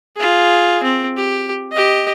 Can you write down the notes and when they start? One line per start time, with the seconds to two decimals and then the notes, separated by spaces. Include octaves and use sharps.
0.16 F4 G#4
0.83 C4
1.17 G4
1.72 G4 D#5